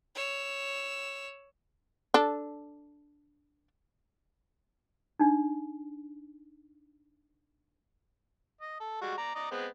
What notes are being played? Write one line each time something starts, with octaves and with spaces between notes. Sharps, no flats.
C#5 E6
D4 A4
D4 D#4
D#5
A4
G3 G#3 F#4
D5 A#5
D5 D#5 A#5
G#3 B3 C4